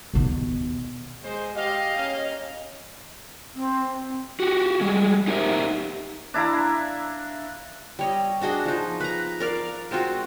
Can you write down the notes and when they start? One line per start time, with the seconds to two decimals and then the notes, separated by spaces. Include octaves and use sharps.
0.14 D#2 B2
1.24 G#3 C5
1.56 G4 D#5 F5
1.97 A#3 C#4 F5
3.55 C4
4.40 F#4 G4
4.81 G3 G#3
5.27 D#4 G4 A#4 C5 D#5 E5
6.34 D4 E4 F5 A#5
7.99 G3 C#5 D#5
8.41 D4 F#4 G#4 D#5
8.65 F3 D#4
9.00 B4 A#5
9.40 A#4 D5 F5
9.91 G#3 C4 F4 F#4